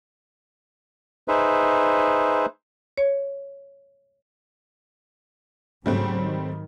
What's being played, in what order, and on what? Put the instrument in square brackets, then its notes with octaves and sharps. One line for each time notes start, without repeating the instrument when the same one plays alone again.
[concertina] D#4 G#4 B4 C5 E5
[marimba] C#5
[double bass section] G#2 C#3 F#3 [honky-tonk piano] G3 A3 C4
[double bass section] D#3